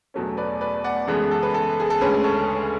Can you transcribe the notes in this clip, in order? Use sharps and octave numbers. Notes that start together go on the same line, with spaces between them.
E2 B2 F#3 A3 C#4
B4 D5
B4 D5
D5 F#5
F#2 C#3 E3 G#3 B3 A4
A4
B4
A4
G#4
A4
D2 C#3 G#3 C#4 G#4 B4
A4 C#5